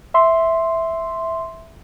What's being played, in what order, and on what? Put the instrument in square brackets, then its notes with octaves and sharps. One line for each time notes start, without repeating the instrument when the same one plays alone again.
[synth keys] E5 C6